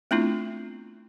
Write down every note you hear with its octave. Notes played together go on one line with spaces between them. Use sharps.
A3 B3 C4 D4 E4 F4